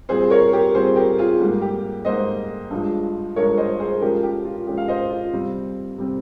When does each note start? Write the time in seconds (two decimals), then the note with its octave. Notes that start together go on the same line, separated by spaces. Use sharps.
0.09 A#2 G3 C4 G#4 C5
0.30 A#4 C#5
0.53 G4 A#4
0.75 A#2 G3 C4 G#4 C5
0.96 G4 A#4
1.18 F4 G#4
1.40 G#2 G3 A#3
1.61 G4
2.05 G#2 G3 A#3 C5 D#5
2.70 G2 F3 G#3
3.36 G2 F3 G#3 A#4 C#5
3.57 C5 D#5
3.79 G#4 C5
4.01 A#2 F3 G#3 C#4 G4 A#4
4.23 G4
4.45 F4
4.67 A#2 F3 G#3 C#4 G4
4.77 F5
4.88 C5 D#5
5.10 F4
5.33 C3 G3 C4
5.97 C3 G3 C4